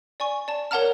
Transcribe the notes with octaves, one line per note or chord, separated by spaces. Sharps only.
D5 G#5 C#6
D5 A5
A#4 C#5 F#5 A5 A#5 F6